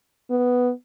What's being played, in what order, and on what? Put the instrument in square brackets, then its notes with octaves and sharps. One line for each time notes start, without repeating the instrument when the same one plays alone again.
[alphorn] B3